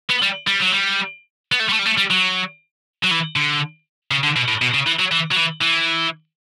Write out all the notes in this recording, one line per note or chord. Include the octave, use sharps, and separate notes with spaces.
B3
G3
G3
F#3
G3
B3
A3
G3
A3
G3
A3
G3
F#3
F#3
E3
D3
C#3
D3
B2
A2
B2
C#3
E3
F#3
E3
F#3
E3
E3